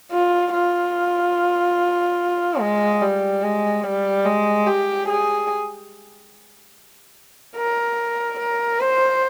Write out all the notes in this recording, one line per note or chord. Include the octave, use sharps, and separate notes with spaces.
F4
F4
G#3
G3
G#3
G3
G#3
G4
G#4
A#4
A#4
C5